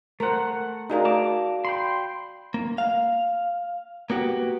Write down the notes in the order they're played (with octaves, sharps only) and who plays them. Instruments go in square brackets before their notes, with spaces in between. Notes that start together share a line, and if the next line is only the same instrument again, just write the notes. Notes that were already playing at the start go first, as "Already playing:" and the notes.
[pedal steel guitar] A3 F#5 [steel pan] A#4 C5
[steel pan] D#4 G#4 A#4 [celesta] F#4 D5 F5
[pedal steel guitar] A5 A#5 D6
G5 B5 C6
[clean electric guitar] A#3
F5
A#3 B3 F#4 G4